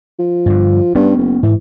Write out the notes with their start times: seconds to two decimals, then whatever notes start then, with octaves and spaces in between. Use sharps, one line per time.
0.19 F3
0.46 G2 D3
0.95 G2 B3 C#4
1.17 F#1
1.43 G#2 E3